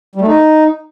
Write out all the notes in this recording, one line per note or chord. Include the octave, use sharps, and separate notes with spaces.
G3
A3
D#4